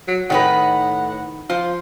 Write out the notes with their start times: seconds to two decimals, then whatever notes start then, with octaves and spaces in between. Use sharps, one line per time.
0.07 F#3
0.30 A2 D#3 D#4 B4 F#5
1.50 F3 F4